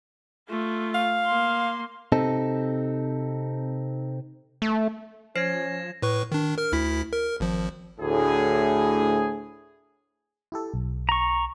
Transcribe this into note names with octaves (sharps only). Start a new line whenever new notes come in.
A3 F4
F5
A#3 C6
C3 C4 D#4 A4
A3
F3 C#4 C5 G#6 A#6 C7 E7
A2 B4 C#6
D#3 D4
A#4 F6
D2 E4 B6
A#4
G#1 F3
D2 A2 G#4
E4 G4 A4
B1
A#5 C#6